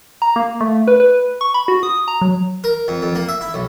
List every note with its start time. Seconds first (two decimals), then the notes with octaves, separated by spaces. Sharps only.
0.22 A#5
0.36 A#3
0.61 A3
0.88 B4
1.00 B4
1.41 C#6
1.54 B5
1.68 F#4
1.83 D#6
2.08 A#5
2.21 F#3
2.64 A#4
2.88 F2
3.02 F2
3.15 A#3
3.29 E5
3.41 E4
3.54 B1